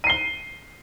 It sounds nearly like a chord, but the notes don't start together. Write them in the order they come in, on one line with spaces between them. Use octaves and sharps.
D#7 C7 G7